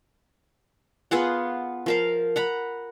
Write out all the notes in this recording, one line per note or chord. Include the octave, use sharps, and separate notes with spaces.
B3 F4 G#4 F#5
F3 A#4 F5
F#5 A#5 B5